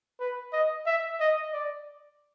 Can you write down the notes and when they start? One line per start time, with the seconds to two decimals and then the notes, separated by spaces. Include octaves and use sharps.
0.20 B4
0.53 D#5
0.86 E5
1.20 D#5
1.53 D5